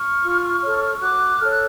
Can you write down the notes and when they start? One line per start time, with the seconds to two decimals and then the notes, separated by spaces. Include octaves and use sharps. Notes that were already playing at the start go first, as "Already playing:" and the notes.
Already playing: C#6 F6
0.23 F4
0.62 A4 C#5
0.97 F6
1.01 F#4 D6 F#6
1.39 A4 C#5 F6
1.50 F#6